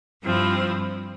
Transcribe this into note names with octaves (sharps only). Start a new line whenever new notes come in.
G2 F3 C4 E4